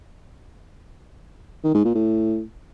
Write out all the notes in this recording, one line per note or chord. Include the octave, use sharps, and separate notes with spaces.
D#3
G#2
A#2
A2